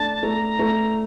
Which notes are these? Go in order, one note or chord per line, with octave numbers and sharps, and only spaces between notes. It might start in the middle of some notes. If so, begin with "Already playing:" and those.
Already playing: A3 D4 A5
A3 A#5
A3